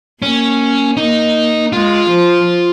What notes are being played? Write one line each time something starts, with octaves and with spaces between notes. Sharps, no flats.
A#3 C#4
A#3 D#4
G#3 F4
F3